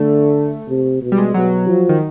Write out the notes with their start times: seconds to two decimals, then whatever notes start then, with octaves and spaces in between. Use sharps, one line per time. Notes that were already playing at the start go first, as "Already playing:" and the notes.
Already playing: D3 A3
0.68 C3
1.02 B2
1.12 G3
1.18 G#3
1.34 B2 F#3
1.67 F3
1.89 D#3